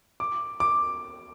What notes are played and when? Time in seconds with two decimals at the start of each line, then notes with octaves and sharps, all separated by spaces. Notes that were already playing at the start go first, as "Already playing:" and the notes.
0.20 D6
0.60 D6